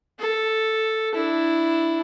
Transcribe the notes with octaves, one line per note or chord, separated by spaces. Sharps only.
A4
D4 E4